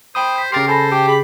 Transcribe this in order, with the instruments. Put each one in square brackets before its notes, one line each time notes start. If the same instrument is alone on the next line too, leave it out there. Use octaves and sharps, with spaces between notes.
[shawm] C5 [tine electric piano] G5 B5 D#6
[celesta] G6 B6
[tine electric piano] C#3 A6 C7 [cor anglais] G4 [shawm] A#4 [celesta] C6
[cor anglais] A4 [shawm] C5 [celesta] G#5 B5 A#6
[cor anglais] G4 [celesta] G5 A5
[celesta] G#4 [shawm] B5